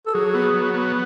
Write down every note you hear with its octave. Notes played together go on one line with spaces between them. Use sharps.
A4
F#3 G#4
B3
F#3
B3